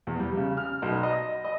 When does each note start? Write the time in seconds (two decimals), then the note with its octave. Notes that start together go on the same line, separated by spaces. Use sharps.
0.07 E2
0.20 G3
0.37 C#3
0.57 F6
0.82 B1
1.03 D#5
1.45 D#5